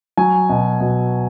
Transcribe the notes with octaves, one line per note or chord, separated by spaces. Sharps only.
F#3 G#5
B2
B2